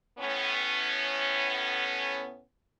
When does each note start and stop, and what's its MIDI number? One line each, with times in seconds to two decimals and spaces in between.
0.19 2.43 45
0.19 2.43 59
0.19 2.43 61